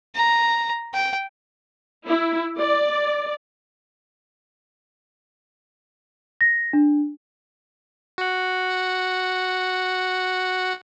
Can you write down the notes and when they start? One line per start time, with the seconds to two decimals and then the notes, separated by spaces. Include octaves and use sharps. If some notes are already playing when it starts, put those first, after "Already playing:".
0.15 A#5
0.94 G5
2.06 E4
2.59 D5
6.41 A#6
6.73 D4
8.18 F#4 F#5